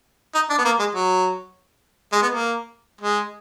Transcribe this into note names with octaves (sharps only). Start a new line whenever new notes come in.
D#4
D4
B3
A#3
G#3
F#3
G#3
B3
A#3
G#3